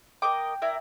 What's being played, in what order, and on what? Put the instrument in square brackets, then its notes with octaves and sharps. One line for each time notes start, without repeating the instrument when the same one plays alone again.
[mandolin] A#4 D#5 D6 [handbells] G5
[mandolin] E4 A#4 D5